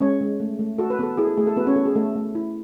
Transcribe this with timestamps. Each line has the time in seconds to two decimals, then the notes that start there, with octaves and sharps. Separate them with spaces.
0.01 G#3 C#4 C#5
0.21 G#3
0.40 A3
0.59 A3
0.78 F#4 A4
0.90 B4
0.99 B3 A4
1.18 E4 G#4
1.27 A4
1.37 A3 G#4
1.47 A4
1.57 B3 F#4 B4
1.67 C#4 C#5
1.76 B3 A4
1.86 G#4
1.95 A3 A4
2.16 A3
2.35 E4